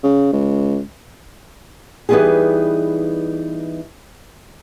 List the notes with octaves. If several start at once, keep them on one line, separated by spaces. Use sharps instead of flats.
C#3
C#2
E3 G3 B3 D#4 G4 G#4